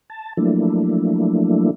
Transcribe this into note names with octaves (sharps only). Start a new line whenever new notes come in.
A5
F3 F#3 A3 A#3 D4 E4